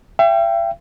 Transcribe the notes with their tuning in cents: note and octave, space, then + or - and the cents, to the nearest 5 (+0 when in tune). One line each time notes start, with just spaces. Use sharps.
E5 +40 G5 +0